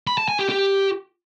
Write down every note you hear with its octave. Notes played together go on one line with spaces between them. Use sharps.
B5
A5
G#5
G4
G4